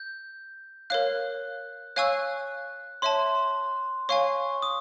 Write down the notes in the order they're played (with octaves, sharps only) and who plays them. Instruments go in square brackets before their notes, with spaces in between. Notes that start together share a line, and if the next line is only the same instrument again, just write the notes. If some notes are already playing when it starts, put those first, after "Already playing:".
Already playing: [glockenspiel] G6
[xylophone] A#4 C#5 F5 [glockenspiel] F#6
[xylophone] C#5 F5 G#5 C#6 E6 [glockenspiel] F#6
[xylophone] C#5 E5 A5 [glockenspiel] C6
[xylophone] C#5 F5 G#5 [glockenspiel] C#6
[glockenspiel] D#6